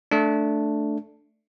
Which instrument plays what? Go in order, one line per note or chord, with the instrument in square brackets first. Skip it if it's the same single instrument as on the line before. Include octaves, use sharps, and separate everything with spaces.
[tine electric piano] A3 D4